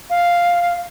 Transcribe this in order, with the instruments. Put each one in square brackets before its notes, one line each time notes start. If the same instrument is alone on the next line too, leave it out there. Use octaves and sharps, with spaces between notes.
[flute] F5